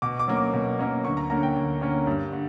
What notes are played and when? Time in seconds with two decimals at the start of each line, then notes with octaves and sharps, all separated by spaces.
0.02 B2 D6
0.19 D6
0.28 F#3 A#3 C#4
0.36 D6
0.54 B2
0.79 F#3 A#3 C#4
1.05 D2 C#6
1.17 A#5
1.30 D3 A#3 C#4 A#5
1.43 G5
1.56 D2
1.81 D3 A#3 C#4
2.07 G2
2.32 D3